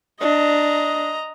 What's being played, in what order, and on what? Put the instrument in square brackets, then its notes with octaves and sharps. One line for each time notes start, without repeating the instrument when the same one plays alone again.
[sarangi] D4 [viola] D#5 A#5